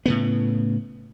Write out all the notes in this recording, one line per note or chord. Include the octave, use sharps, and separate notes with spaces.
A2 C#3 B3